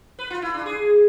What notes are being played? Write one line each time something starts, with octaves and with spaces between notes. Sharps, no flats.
B4
F4
E4
D4
G#4